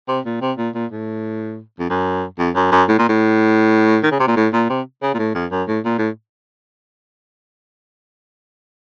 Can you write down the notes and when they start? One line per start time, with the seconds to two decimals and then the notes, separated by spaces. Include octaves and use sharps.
0.08 C3
0.25 A#2
0.41 C3
0.58 A#2
0.74 A#2
0.91 A2
1.80 F2
1.90 F#2
2.39 F2
2.55 F#2
2.72 F#2
2.88 A2
2.99 A#2
3.09 A2
4.04 D#3
4.12 C#3
4.20 C3
4.28 A#2
4.36 A2
4.53 A#2
4.70 C3
5.02 C#3
5.14 A#2
5.19 A2
5.35 F2
5.51 F#2
5.68 A2
5.85 A#2
5.99 A2